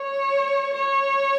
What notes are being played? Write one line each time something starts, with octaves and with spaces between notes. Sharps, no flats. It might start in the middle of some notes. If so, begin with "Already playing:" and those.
Already playing: C#5
C#5